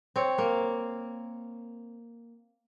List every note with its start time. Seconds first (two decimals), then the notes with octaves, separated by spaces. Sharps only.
0.16 C4 C#5
0.38 A#3